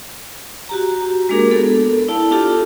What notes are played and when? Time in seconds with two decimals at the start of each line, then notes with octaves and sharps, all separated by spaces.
0.69 F#4 G4 A#5
1.29 G#3 A#3 D4 G#4 A#4
1.51 B3 A4
2.08 E4 D5 F5 A5
2.31 D4 F4 G4 A4